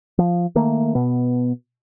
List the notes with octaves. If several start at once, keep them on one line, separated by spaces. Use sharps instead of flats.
F3
D#3 A3 A#3
B2 B3